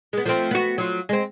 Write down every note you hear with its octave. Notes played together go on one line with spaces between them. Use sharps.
G#3 B3
F3 A3 C4
B3 F#4
F#3 F4
G#3 C4